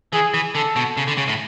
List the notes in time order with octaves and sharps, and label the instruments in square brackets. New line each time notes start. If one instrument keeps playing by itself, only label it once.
[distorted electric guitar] E3 [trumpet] G#4
[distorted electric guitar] E3
[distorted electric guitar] D3 [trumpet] A4
[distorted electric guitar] B2
C#3
D3
C#3
A2